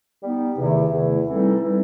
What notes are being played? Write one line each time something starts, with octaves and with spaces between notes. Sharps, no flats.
G3 B3 D#4
E2 C3 D#3 A3 E4
E2 C3 D#3 A3 E4
E3 G3 C4 D#4 A4
E3 G3 C4 D#4 A4